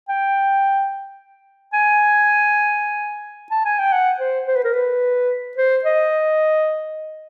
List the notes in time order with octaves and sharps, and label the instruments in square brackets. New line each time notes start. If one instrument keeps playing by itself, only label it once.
[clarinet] G5
G#5
A5
G#5
G5
F#5
C5
C5
B4
A#4
B4
C5
D#5